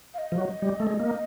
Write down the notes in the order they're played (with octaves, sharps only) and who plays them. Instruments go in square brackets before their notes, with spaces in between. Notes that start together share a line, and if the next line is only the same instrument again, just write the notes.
[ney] F5
D#5
[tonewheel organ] F3
F#3
G3
A3
G#3
A#3